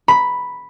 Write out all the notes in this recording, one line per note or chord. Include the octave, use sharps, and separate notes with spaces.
B5